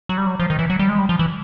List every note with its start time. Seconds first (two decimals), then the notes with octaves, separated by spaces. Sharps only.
0.09 F#3
0.18 G3
0.27 F#3
0.39 F3
0.50 D#3
0.59 E3
0.70 F#3
0.79 G3
0.89 G#3
0.99 G3
1.09 F3
1.19 E3